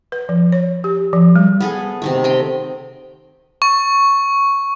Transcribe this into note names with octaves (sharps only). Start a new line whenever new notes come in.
B4
F3
C#5
G4
F3
G3
B3 G#4 A4
C3 D#3 A3
D#5 G5 C6
C#6